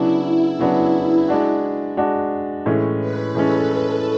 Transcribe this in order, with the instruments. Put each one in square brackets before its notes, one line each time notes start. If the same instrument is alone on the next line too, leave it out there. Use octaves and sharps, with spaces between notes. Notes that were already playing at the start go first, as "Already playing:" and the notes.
Already playing: [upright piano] C#3 F#3 B3 D4 [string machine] E4
[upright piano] C#3 F#3 B3 D4
G#3 D4 F#4
G#3 D4 F#4
A2 E3 G#3 C#4
[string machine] B4
[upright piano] A2 E3 G#3 C#4 [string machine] A4